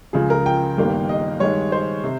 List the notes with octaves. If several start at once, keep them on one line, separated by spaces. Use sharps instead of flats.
C#2 C#3 F3 G#4
A#4
G5
G1 G2 D#3 A#3
D#5
G2 D#3 G#3 C#5
C5
C3